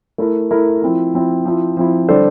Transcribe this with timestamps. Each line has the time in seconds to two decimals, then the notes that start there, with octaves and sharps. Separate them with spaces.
0.18 A3 E4 A#4
0.51 A3 E4 A#4
0.82 F3 C4 E4
1.14 F3 C4 E4
1.45 F3 C4 E4
1.77 F3 C4 E4
2.09 D3 G3 D4 A4 C5